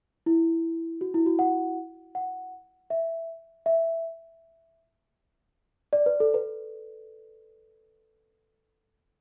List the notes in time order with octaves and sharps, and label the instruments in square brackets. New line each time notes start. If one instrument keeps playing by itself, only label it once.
[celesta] E4
F#4
E4
F#4
F#5
F#5
E5
E5
D5
B4
A4
B4